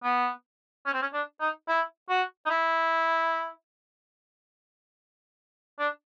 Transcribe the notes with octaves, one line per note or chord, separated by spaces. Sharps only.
B3
C#4
C4
C#4
D4
D#4
E4
F#4
D#4
E4
D4